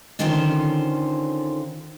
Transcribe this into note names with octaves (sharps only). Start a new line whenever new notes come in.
D3 D#3 C#4 F4 A4 C5